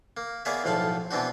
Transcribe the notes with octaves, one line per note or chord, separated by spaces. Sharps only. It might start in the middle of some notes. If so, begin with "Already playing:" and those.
A#3
A#3 B3 G#4 C#5 D5 E5
B1 E2 A2 F3 F5 F#5
B2 E3 B3 C4 D4 F#4